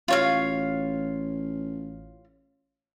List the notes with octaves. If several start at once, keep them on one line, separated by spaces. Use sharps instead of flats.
A1 F4 C#5 F5